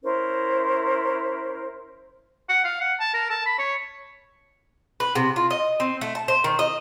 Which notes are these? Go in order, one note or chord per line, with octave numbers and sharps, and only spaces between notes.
C#4 E4 A#4 C5
F#5
F5
F#5
A5
A#4
A5
B5
C#5
B4
C3
F4
D#5
C4
A3
A5
C5
D#3
D#5